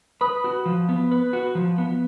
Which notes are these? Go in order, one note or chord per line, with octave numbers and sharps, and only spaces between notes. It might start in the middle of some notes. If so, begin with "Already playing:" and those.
B4 B5 D#6
F#4
F3
B3
B4
F#4
F3
B3